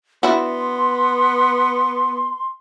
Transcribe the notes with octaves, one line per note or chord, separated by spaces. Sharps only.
B3 D4 E4 F#4 C6